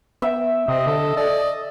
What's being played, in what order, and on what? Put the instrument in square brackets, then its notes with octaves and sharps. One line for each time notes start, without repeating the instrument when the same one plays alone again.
[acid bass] B3 [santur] E5 G5 E6
[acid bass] C3 [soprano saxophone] C4 [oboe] D#5
[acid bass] D3 [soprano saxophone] A4
[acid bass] A4 [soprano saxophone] D5